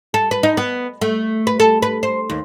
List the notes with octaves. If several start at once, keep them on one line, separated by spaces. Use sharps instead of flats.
A4
B4
D#4
B3
A3
B4
A4
B4
C5
D#2